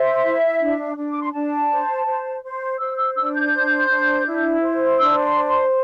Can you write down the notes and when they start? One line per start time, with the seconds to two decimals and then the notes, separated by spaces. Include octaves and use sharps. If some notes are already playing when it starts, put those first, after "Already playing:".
Already playing: C5 E5
0.23 E4
0.60 D4
0.96 D4
1.11 D6
1.22 C6
1.33 D4 A5
1.69 C5
2.06 C5
2.42 C5
2.79 C5 E6
2.97 E6
3.16 D4 E6
3.34 G6
3.53 C5
3.89 D4
4.25 E4
4.62 C5
4.99 D4 E6
5.23 C6
5.36 C5
5.48 C6